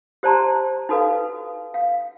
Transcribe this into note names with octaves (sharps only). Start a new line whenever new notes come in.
G4 C5 D5 A5 A#5 C6
D#4 F#4 A4 B4 F5
F5